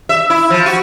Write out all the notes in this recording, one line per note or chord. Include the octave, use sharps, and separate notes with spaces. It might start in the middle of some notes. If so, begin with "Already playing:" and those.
E5
E4
F3
F#4